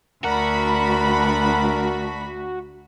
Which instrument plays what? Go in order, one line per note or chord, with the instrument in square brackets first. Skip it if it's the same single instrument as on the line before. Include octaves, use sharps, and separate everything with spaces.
[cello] D2 [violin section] D4 B5 [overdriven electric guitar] F#4 [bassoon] A#4